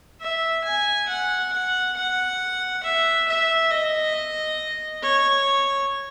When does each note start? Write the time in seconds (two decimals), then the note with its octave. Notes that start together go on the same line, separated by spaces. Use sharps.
0.20 E5
0.64 G#5
1.08 F#5
1.53 F#5
1.96 F#5
2.83 E5
3.28 E5
3.71 D#5
5.03 C#5